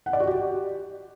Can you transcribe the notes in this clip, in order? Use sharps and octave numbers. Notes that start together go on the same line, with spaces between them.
F#5
D5
F#4
G4